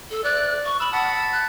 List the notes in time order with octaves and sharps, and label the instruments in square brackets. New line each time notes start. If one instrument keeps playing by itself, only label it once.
[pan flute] A4
[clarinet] D5 [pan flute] F#6
[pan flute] C#6
[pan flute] B5 [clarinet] E6
[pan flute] F#5 [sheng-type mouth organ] A5 B5
[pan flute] F#6